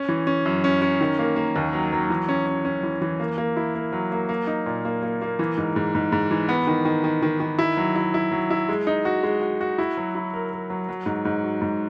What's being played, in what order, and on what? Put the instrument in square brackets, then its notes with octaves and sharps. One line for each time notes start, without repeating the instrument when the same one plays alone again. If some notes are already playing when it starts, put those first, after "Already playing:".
Already playing: [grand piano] C#4
E3
C#4
F#2
C#4
C#4
D#3
A#3
A#3
D#2
F#3
F#3
E3
C#4
C#4
C#4
E3
E3
A#3
A#3
E4
A#3
F#3
A#3
A#3
D#4
A#2
A#3
A#3
A#3
E3
G#2
G#2
G#2
G#2
E3
B3
D#3
D#3
D#3
D#3
D#3
E4
F#3
E4
E4
F#3
E4
G#3
D#4
F#4
G#3
F#4
F#4
E4
F#3
E4
A#4
A#4
F#3
F#3
G#2
G#2
F#4
G#2